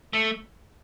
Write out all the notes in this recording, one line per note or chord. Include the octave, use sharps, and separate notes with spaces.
A3